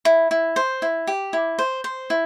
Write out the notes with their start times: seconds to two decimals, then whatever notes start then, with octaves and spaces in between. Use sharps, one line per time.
0.05 E4
0.31 E4
0.56 C5
0.82 E4
1.07 G4
1.33 E4
1.59 C5
1.84 C5
2.10 E4